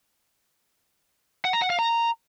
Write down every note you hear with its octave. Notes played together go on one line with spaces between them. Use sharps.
F#5
A#5
F#5
F5
A#5